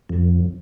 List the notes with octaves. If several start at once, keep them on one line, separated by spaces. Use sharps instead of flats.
F2